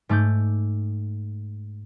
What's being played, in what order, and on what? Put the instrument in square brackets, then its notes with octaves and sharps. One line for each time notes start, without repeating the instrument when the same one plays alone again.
[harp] G#2 A3 D6 G6